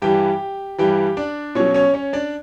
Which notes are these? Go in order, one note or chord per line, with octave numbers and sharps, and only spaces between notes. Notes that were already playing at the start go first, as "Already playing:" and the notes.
G2 E3 G3 G4 G5
G2 E3 G3 G4 G5
D4 D5
B2 F#3 C#4 C#5
C#4 C#5
C#4 C#5
D4 D5